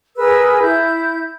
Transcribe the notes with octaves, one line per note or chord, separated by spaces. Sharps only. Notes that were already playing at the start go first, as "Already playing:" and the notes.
G#4 A#4 B4 E6
E4 G6